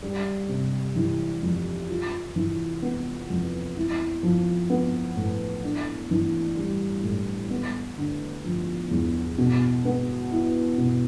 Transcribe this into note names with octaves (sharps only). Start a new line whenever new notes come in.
G3
C3
E3
F2
F4
E3
B3
F2
E4
F3
B3
A2
D4
E3
G3
A2
B3
D3
F3
E2
B2
B3
E4
B2